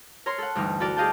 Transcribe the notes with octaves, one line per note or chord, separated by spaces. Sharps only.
A#4 C#5 A#5 C6
A4 F#5
D2 G2 E3 D#4
E4 F#4 A4 A#4 D5
G4 G#4 D#5 F5 G5 A5